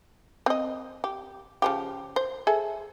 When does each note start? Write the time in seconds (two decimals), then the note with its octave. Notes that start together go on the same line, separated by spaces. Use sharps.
0.46 C4 D#5
1.04 G4
1.62 C#3 F3 G4
2.16 C5
2.47 G#4 A4 E5